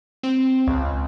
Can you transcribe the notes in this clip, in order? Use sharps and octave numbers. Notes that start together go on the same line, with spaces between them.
C4
C#2